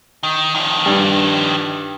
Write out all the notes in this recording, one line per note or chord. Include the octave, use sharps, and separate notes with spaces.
D#3
D#3 F3
G2